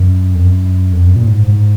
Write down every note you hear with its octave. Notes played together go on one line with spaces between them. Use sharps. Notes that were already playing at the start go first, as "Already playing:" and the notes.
Already playing: F#2
F2
F#2
F2
F#2
A#2
G#2
G#2